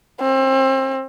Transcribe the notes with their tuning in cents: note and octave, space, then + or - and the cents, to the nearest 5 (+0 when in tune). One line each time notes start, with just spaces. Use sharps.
C4 +30